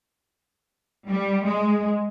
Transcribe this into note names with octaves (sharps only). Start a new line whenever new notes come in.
G3
G#3